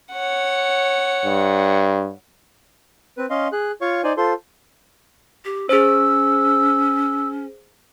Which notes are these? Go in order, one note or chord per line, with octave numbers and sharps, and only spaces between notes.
C#5 F#5
G2
C4 B4
C#4 D#5 F5 C6
G#4 F#6
F4 C#5 F5 C#6
D#4 C5 D5 G#5
F4 A4 C5 C6
G4
C#4 G#4 C5 E6